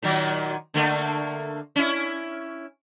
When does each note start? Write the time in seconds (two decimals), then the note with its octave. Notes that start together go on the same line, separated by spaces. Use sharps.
0.02 A#2 D#3 F#3
0.74 D3 A3 A#3
1.76 C#4 E4